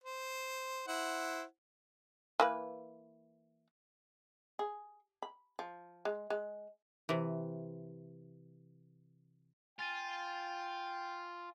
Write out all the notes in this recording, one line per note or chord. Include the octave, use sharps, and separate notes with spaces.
C5
E4 C5 F#5
E3 A#3 B4
G#4
B5
F3
G#3
G#3
C3 E3
F4 G5 G#5 A6 D#7